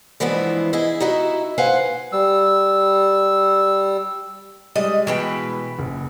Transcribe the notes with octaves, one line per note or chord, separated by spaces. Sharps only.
G2 E3 F3 G#3 B3 E4
E4 G#4 D#5
D#4 E4 F#4 D#5 E5
B4 C5 F5 F#5 G#5
G3 E6
G3 G#3 D#5
B2 E3 G#3 B4 G5
F#1